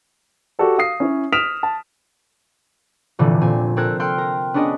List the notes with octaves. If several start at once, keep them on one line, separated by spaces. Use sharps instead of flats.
F#4 G4 A4 D5
F5 D#6 C7
C#4 E4 C#5
D#6 F6 B6 D7 E7 F7
A5
F1 A#2 D3 E3
A#2 C4 G#5
C4 A4 A#4 F#6 G#6
A4 G5 C6 F6 F#6
A#4
B3 C#4 D4 G#4 D#5